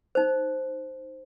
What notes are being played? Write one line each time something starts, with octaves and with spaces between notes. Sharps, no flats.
D#4 C5